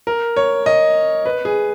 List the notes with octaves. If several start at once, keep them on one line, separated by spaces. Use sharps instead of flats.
A#4
C#5
D#5
B4
G#4